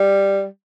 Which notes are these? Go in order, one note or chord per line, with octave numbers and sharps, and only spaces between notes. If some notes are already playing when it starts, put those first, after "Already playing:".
Already playing: G3